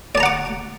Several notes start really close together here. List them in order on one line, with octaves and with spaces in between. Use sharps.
D5 A5 A#5 F#5 D6